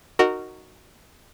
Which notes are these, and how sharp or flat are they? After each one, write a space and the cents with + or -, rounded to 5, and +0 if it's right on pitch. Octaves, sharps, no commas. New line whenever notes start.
D#4 -10 F#4 +0 A#4 -15